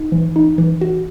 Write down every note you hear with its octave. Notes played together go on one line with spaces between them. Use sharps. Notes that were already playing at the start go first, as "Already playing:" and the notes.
Already playing: D#4
E3
D#4
E3
F#4